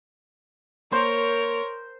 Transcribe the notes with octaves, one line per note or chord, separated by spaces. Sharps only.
A#3 A#4 C5 C#5